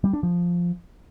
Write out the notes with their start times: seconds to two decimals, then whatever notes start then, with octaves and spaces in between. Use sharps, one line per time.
0.04 G3
0.13 D4
0.23 F3